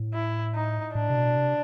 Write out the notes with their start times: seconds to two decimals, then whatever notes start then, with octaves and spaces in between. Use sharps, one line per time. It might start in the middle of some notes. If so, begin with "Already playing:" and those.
Already playing: A2
0.14 E4
0.55 D#4
0.95 A2 D4
1.10 C3
1.16 B2
1.36 C3